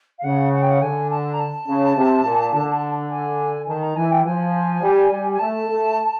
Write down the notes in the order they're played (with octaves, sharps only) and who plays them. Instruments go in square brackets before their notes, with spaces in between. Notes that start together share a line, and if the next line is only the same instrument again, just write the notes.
[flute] F5
[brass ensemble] C#3 [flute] F#5
[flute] F#5
G5
F#5
[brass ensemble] D3 [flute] G#5
[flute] A5
A#5
A5
[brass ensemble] C#3
C3
A#2
D3
[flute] G#5
[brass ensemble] D#3 [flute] A5
[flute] A#5
[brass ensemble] E3 [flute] G#5
[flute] G5
[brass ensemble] F3 [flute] G#5
[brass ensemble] G3
G3
[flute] G#5
[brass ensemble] A3 [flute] A5
[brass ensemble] A3